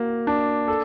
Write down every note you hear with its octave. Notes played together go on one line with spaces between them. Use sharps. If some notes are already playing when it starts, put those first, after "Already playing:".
Already playing: A#3 F#4
D4
A4